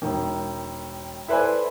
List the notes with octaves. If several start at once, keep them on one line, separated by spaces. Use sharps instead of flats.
E1 D#3
E4 A4 B4 C5 D5 G#5